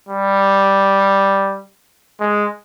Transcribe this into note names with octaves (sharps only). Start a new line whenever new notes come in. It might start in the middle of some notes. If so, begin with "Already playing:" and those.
G3
G#3